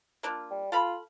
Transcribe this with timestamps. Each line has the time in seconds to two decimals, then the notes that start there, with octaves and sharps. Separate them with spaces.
0.23 A#3 D4 F4
0.51 G3
0.72 F4 A4 F5 B5